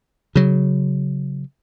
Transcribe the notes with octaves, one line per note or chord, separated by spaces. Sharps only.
C#3 F#3